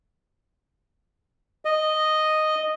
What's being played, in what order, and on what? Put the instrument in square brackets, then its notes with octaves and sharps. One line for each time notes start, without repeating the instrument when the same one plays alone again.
[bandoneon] D#5